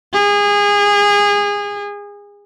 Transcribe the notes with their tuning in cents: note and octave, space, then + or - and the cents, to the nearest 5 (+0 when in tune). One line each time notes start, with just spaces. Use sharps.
G#4 -25